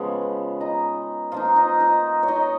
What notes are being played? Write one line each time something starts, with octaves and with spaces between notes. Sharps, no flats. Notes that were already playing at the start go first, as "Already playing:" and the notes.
Already playing: C#3 F3 G#3 B3 B4
D#4 D#5
F3 A#3 D#4 F4 F5
D#4 D#5
D#4 D#5
C#5
D#4 D#5